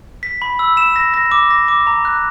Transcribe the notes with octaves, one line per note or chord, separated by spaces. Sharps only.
B6
B5
E6
E7
A#6
A#6
D6
A#6
D6
A#5
F#6